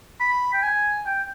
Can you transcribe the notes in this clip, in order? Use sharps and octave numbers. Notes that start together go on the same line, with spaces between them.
B5
G5
G#5
G5